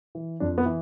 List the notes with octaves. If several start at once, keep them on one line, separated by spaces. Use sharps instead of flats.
E3
F2 D4
B3
E3